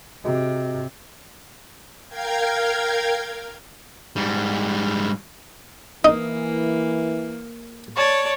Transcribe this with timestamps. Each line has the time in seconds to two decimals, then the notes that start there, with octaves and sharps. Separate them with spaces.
0.24 C3 F#4 G#4 D#5
2.08 A#4 F5 G5 G#6
4.16 G#2 G3
6.05 E3 A#3 D#4
7.96 C#5 D5 A5